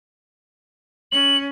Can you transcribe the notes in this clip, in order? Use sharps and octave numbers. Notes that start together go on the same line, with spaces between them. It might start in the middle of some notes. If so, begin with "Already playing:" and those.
C#4 F#7